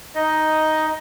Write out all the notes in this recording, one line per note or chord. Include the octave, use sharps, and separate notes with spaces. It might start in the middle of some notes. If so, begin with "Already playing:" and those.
D#4 D#5